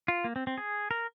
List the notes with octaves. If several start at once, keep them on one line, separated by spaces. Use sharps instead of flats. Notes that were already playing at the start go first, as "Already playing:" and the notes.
F4
A#3
C4
C4
G#4
A#4